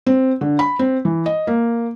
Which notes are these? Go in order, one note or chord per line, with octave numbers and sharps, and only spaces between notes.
C4
D3
B5
C4
E3
D#5
A#3